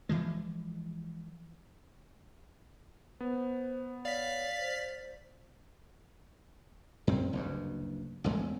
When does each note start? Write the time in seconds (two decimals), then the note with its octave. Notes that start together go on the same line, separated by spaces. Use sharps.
0.09 E3 F3 G#3
3.20 B3 C5
4.05 C#5 D5 F5 B6
4.59 C5
7.07 F#2 C4
7.33 F#1 D2 G2
8.24 A1 E2 G#3 A3